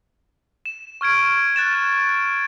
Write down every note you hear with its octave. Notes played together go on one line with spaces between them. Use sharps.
E7
C#6 F6 G#6 D7
F#6 A6 E7